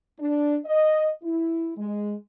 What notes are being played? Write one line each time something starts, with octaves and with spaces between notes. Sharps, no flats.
D4
D#5
E4
G#3